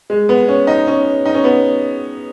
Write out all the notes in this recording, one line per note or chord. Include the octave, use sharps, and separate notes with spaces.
G#3
B3
C#4
D#4
C#4
D#4
C#4
B3